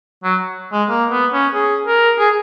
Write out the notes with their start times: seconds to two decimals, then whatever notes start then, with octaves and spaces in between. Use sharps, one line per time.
0.24 F#3
0.72 G#3
0.89 A#3
1.10 B3
1.33 C#4
1.54 G#4
1.86 A#4
2.19 G#4